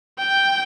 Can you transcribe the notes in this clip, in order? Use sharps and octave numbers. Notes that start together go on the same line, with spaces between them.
G5